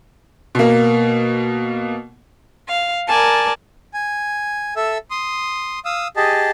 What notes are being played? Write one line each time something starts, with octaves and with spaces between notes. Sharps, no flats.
B2 A#3
F5
A#4 D5 G#5 A5
G#5
A4 E5 E6
C6 D#6
F5 D#6 E6
G4 G#4 D#5 A5